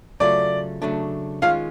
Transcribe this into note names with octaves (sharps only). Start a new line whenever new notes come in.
C#3 F#3 A3 C#4 F4 D5
C#3 F#3 A3 D4
D#3 G#3 C#4 F4 F5